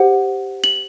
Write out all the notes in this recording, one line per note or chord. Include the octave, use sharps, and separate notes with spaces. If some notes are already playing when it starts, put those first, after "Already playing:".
Already playing: G4 C5 F#5
F#7